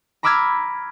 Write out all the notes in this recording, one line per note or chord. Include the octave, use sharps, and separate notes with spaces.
A#5 B5 D6 E6 F6 G#6